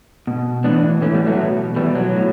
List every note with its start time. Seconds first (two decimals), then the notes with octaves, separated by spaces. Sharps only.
0.27 B2
0.64 A2 E3 B3 D4
1.01 A2 E3 A3 C#4
1.14 G3 B3
1.27 F#3 A3
1.39 B2
1.76 B2 E3 G3
1.95 F#3
2.14 A2